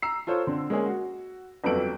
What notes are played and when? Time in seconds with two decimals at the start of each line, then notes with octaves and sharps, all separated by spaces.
0.02 A#5 E6 C7
0.27 F4 A4 C5 C#5
0.47 D3 C4
0.70 G#3 A#3 C#4 G#4
0.86 F#4
1.64 G1 F2 F#3 A4 D7 F#7